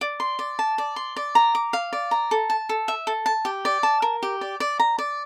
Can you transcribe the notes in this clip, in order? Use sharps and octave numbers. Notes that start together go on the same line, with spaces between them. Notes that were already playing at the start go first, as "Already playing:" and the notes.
D5
C6
D5
A5
D5
C6
D5
A#5
D6
F5
D5
A#5
A4
A5
A4
E5
A4
A5
G4
D5
A5
A#4
G4
D5
D5
A#5
D5